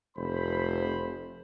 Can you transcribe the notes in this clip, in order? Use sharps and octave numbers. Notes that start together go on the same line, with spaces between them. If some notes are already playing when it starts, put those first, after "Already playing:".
F1 C5 B5